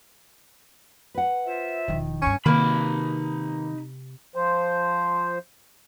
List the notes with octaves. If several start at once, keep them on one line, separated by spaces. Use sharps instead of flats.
B4 F#5
F4 C5 E5
E1 D#3 F3
D2 G2 C#4 C#6
C3 D#3 A#3 D#4 B4 B5
F3 C5